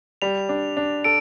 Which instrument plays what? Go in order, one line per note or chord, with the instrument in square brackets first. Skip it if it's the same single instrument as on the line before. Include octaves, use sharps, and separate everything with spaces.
[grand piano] G3 [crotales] F7
[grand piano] D4
D4
[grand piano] A4 [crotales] D7